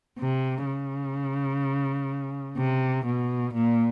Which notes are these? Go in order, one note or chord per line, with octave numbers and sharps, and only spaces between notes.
C3
C#3
C3
B2
A#2